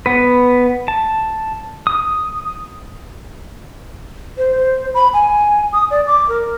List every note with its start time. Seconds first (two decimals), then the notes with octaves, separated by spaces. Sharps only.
0.06 B3 B4
0.88 A5
1.87 D#6
4.38 C5
4.57 C5
4.94 B5
5.13 G#5
5.73 D#6
5.90 D5
6.07 D6
6.29 A#4